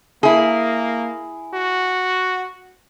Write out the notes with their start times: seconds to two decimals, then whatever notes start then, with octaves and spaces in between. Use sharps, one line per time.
0.23 A#3 E4 G#4
1.54 F#4